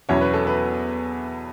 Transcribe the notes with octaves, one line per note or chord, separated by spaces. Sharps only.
E2 B2 F#3 C#4 E4 C#5
B4
A4
B4